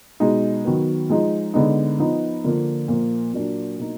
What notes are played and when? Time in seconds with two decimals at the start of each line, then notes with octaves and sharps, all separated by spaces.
0.20 B2 G#3 D#4
0.65 D#3 F#3 B3
1.10 F3 G#3 D#4
1.54 D3 G#3 B3 D#4
1.99 F3 B3 D#4
2.44 D3 F3 A#3 D4
2.88 A#2 F3 A#3
3.33 A#2 F#3 A#3 D4
3.77 B2 A#3 D#4